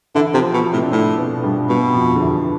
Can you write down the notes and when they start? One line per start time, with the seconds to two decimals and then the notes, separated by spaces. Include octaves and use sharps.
0.15 D3 E3 E4
0.34 C3 F3 F4
0.54 B2
0.73 A2 C3 C4
0.83 D4
0.91 A2 C3 C4
1.18 B2 B3
1.43 G2 G3
1.69 G2 B2 G3
1.94 F2 F3
2.16 D3
2.21 E2 E3